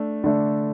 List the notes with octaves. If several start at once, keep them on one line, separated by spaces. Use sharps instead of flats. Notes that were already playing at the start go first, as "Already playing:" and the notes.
Already playing: A3 D4
D3 A3 D4